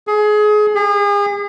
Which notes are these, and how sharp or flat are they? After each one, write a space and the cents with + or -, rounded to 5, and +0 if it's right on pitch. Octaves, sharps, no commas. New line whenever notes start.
G#4 +25
G#4 -35